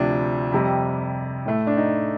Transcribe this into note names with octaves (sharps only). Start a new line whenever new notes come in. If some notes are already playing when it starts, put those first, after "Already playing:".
Already playing: D2 C3 F3 D4
F2 C3 G3
A2 A3
D4
D#4